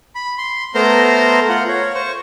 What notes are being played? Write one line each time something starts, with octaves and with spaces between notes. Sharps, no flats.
B5
C6
A3 B3 A#4 C5 A#5 C6
F4 F#5
C#5
C5 C#6